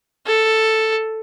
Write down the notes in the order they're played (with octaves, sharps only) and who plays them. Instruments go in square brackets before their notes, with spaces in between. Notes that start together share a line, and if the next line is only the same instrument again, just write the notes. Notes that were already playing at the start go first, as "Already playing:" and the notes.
[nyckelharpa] A4